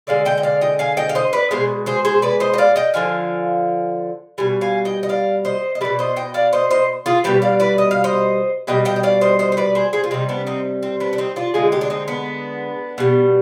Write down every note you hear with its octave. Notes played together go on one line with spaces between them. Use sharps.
D3 G#3 D5 F5
D#5 G5
D#5
D5 F5
D#5 G5
F5 G#5
D#5 G5
F5
C5 D#5
B4 D5
B2 G#3 G#4 C5
G#4 C5
G#4 C5
B4 D5
C5 D#5
D#5
D5 F5
D#5 G5
D3 F3 F5 G#5
B2 G3 G#5
F5 G#5
D#5 G5
D#5
D5 F5
C5 D#5
D#5
B2 G3 B4 D5
C5 D#5
D#5 G5
D5 F5
C5 D#5
C5 D#5
F4 G#4
B2 G3 G4 B4
D5 F5
B4 D5
D#5
F5
C5 D#5
B2 G3 D#5 G5
D#5 G5
D#5
D5 F5
C5 D#5
C5 D#5
C5
B4 D5
G#4 C5
G#4 C5
F4
C3 G3 C4 D#4
B3 D4
C4 D#4
C4
B3 D4
D4
C4 D#4
D4 F4
D3 G#3 F4 G#4
D#4 G4
D4
C4 D#4
B3 D4
B2 G3